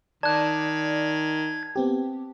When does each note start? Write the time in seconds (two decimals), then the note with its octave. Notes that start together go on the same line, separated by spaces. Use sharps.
0.23 D#3 D5 A5 F#6 G#6
1.76 B3 C4 G4